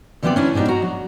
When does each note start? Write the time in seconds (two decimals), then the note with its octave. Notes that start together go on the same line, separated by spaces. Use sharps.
0.22 D3 E3 G3 B3 C4 D5
0.36 C#4 D4 E4
0.54 G#2 B2 G3 D4 D#4
0.68 F#4 F#5 A#5
0.82 F#3